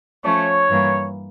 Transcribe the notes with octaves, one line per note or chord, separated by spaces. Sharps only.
F3 A3 C#4 C#5
G2 E3 A#3